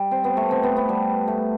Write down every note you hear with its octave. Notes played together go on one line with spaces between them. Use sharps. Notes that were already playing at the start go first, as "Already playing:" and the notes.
Already playing: G3
C4
B3
A3
C4
B3
B3
G3
A3